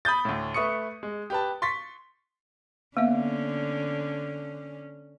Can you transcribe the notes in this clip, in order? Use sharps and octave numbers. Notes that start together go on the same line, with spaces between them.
B5 D#6 G6 A6
D2 A2
A3 B4 C#6 D#6 C#7
G#3
G4 B4 A5
C6 C#6 A6 B6
D3 A#3 B3 C#4 E5